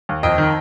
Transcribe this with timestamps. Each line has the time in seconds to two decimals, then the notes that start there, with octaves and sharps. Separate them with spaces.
0.09 D#2
0.23 F2 D#5 G5
0.38 D#3